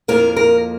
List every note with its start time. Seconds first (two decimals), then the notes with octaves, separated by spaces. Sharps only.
0.08 F2 F3 A#3 A#4
0.36 A#4